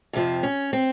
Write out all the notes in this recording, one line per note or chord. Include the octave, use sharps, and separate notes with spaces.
F2 C3 F3
C#4
C4